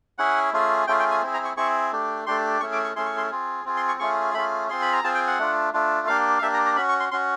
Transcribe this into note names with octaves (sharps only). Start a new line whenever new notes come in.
C#4 E4 G#4 F#5
A3 C#4 F4 G#4
A3 C#4 F4 G#4 G5
G5
G#5
C4 E4 G#4
A#5
C#6
C4 E4 G#4 C#6
A3 D4 G4
A3 D4 G4 C6
A3 C#4 E4 G#4 C#6
D6
C#6
A3 C#4 E4 G#4 C6
C#6
C6
C4 F4 G#4
C4 F4 G#4
C6
C#6
A3 C#4 F4 G#4 C#6
A3 C#4 F4 G#4 B5
C4 F4 G#4 C6
B5
A#5
C4 F4 G#4 A5
G5
F#5
A3 D4 F4
A3 D4 F4
A#3 D4 G4 F5
F5
A#3 D4 G4 E5
A#5
A#5
C#4 F#4 B5
C#6
C6
C#4 F#4 C6